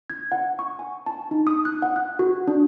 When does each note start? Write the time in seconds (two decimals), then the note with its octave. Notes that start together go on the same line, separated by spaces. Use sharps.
0.10 G#6
0.32 F#5
0.59 C#6
0.79 G#5
1.06 A5
1.31 D#4
1.47 D#6
1.65 F#6
1.82 F#5
1.96 F#6
2.19 F#4
2.48 D4